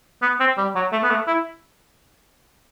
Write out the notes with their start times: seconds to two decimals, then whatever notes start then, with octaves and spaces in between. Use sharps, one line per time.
0.22 B3
0.40 C4
0.57 G3
0.75 F#3
0.92 A3
1.03 B3
1.11 A3
1.27 E4